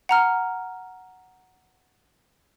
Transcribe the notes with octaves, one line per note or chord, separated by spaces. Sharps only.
F#5 A#5 F6